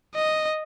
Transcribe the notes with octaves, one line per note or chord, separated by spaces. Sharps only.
D#5